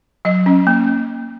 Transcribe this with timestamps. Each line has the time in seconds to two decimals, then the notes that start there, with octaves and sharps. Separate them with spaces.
0.25 F#3 D#5
0.46 C#4
0.67 A#3